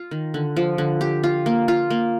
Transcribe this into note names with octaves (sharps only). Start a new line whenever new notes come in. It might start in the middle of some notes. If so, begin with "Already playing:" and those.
Already playing: F4
D#3
D3
F3
D3
G4
F4
A#3
F4
A#3